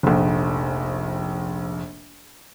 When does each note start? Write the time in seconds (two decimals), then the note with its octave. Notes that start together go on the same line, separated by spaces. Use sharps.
0.03 F1 A#1